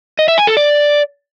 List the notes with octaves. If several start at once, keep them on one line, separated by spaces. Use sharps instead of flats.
D#5
E5
G#5
A4
D5